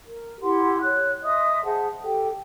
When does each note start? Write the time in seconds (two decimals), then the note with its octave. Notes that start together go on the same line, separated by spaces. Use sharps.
0.06 A#4
0.42 E4 G4 F#5 C6
0.81 C#5 F#6
1.23 D#5 E5 C6 D#6
1.64 G#4 C5 F#5 A5
2.02 G4 A4 G5